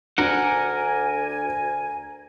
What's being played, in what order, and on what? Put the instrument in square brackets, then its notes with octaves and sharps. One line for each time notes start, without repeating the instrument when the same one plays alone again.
[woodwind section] D2 G#5 [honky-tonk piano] D4 [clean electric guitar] A#4 F#5